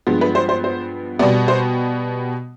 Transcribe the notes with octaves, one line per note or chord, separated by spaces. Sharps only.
G2 F3 G#3 B3
B4
C5
C5
C5
B2 G3 B3 D5
C5